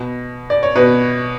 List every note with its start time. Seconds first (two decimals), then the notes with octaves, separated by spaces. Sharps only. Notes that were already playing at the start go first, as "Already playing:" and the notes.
Already playing: B2
0.50 D5
0.63 C#5
0.76 B2 B4